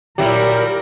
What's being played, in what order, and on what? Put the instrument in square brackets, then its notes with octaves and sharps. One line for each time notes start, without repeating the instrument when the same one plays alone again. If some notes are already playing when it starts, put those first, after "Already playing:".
[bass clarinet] A#2 [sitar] F#3 G3 E4 [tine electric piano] G4 [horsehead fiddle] A#4